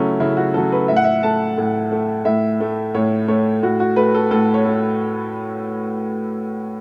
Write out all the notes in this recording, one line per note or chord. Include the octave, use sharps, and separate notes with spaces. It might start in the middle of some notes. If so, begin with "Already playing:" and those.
Already playing: C#3 F#3 A3 C#4 E4
C#3 E4
F#4
F#3 A3 A4
B4
A2 E5
F#5
E5
A3 A5
A2
A3
A2 E5
A3
A2 C#5
A3 C#5
A2 F#4
F#4
A3 B4
A4
A2 A4
C#5
A3